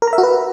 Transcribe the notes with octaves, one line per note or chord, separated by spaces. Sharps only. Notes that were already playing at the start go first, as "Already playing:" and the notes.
A#4
A#5
E5
F#4
B4